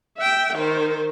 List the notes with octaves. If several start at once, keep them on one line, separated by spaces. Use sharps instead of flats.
E5 G5
D#3 C5